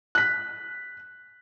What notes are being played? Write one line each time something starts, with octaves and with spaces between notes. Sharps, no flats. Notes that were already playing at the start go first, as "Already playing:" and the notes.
F#6 B6